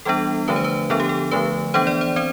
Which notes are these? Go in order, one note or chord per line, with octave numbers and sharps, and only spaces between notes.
E3 G3 B3 D4 A4
D3 F3 A3 D4 B4
C5
B4
D3 F3 B3 D4 A4
G4
A4
D3 F3 A3 B4
E3 B3 D4 C5
D5
C5
C4 C5